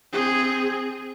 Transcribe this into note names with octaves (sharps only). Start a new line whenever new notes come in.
C4 G#4